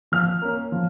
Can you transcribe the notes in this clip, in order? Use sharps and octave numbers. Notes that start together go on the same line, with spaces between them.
F3 F6
A#3 C#4
F3